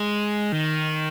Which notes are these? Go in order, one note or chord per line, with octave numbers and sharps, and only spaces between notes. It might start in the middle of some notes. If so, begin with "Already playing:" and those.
Already playing: G#3
D#3